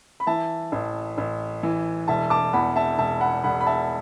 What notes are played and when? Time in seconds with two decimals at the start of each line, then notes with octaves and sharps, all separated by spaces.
0.20 B5
0.27 E3 E5 A5
0.72 A1
1.18 A1
1.63 E3
2.08 E1 E5 A5
2.30 A5 D6
2.53 E2 F#5 B5
2.76 E5 A5
2.98 E1 E5 A5
3.21 F#5 B5
3.43 E1 F#5 B5
3.60 B5
3.66 E5 A5